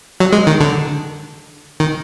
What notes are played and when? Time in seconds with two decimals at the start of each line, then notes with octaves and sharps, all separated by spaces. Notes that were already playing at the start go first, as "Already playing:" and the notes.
0.20 F#3
0.33 G#3
0.47 D#3
0.60 D3
1.80 D#3